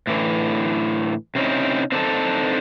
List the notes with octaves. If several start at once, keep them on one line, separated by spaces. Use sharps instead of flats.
A2 D3 E3
C3 C4 C#4 D#4 E4
C4 D4 D#4 F4 A4